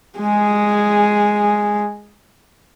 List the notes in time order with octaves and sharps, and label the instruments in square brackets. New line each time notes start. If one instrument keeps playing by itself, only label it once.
[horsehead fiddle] G#3 G#4